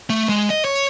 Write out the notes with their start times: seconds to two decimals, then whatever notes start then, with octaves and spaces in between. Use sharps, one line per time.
0.10 A3
0.29 G#3
0.50 D#5
0.65 C#5